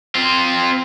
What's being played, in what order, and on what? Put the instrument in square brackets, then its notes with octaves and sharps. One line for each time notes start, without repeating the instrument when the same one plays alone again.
[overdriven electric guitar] C4 F4